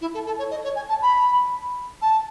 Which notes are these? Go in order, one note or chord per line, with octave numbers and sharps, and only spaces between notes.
E4
A4
A4
C#5
D#5
C#5
G#5
A5
B5
A5